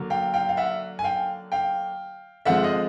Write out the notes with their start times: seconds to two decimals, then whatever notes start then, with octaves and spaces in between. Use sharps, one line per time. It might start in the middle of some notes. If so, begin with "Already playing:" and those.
Already playing: D3 F#3 A#3
0.10 F5 G5
0.34 F5 G5
0.49 F5
0.57 E5 F#5
0.99 G#5
1.04 F5 G5
1.52 F5 G5
2.45 D3 F3 G#3 C4 E5 F#5
2.63 D#5 F5